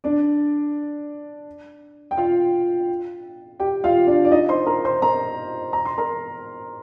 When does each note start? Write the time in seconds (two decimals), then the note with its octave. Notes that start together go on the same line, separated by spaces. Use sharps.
0.04 D4 D5
2.11 G5
2.17 F4 F5
3.60 G4 G5
3.84 F4 F5
4.07 D4 D5
4.25 D5
4.31 D#4 D#5
4.49 C5 C6
4.66 A#4 A#5
4.85 C5 C6
5.02 A#4 A#5
5.73 A#5
5.85 C6
5.98 A#4 A#5